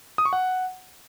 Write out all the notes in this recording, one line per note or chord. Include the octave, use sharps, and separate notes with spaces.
D#6
C#6
F#5